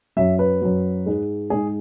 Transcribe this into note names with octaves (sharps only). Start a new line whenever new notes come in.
F#2 F#3 E5
B4
F#2 F#3
G#2 G#3
G#2 G#3 G#4